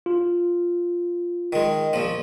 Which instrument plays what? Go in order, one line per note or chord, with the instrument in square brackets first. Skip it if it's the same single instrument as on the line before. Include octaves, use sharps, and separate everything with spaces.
[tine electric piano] F4
[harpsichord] D#3 G#3
A#1 F3